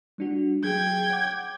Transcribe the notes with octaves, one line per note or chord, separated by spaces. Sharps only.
G3 D4 F#4
F#3 G#4 G5 G#6
C#5 F#5 D6